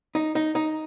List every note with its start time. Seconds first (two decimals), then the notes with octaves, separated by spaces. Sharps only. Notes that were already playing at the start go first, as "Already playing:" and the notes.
0.15 D#4
0.35 D#4
0.55 D#4